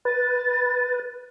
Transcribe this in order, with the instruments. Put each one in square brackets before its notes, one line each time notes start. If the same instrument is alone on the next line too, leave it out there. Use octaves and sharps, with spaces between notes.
[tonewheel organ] B4 [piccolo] A6